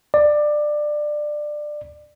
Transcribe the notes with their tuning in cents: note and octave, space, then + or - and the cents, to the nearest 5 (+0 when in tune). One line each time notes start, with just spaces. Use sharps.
D5 +20